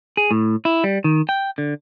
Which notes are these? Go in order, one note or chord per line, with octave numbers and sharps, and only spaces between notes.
G#4
A2
E4
G3
D#3
G5
D3